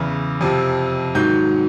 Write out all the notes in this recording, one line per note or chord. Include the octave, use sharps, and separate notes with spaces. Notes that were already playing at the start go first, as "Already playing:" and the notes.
Already playing: E2 C#3 E3
F2 C3 F3
G#2 D#3 F#3 G6